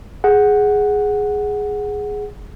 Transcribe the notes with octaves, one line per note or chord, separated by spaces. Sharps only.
G#4 F#5